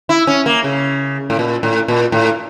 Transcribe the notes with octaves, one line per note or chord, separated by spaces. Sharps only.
E4
C#4
A#3
C#3
A2
A#2
A2
A#2
A2